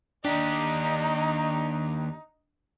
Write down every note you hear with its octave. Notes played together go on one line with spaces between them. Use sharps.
D#2 D4 D#4 G4